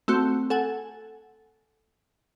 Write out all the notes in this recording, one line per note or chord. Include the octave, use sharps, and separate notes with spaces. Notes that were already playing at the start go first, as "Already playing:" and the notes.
A3 C4 F#4
A4 F#5 G#5